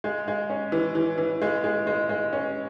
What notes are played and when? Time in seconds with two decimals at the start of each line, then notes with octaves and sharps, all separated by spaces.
0.04 G#3
0.28 G#3
0.50 C#4
0.72 E3
0.95 E3
1.18 E3
1.42 G#3
1.64 G#3
1.87 G#3
2.09 G#3
2.33 C#4